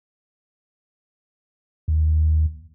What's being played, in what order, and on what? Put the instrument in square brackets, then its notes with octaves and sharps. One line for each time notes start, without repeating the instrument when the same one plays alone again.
[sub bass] D#2